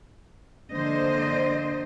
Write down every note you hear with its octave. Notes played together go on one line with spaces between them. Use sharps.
D3 A#3 C5 D#5